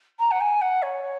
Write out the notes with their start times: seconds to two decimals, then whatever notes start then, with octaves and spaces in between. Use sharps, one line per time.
0.19 A#5
0.31 F#5
0.40 G#5
0.61 F#5
0.82 C#5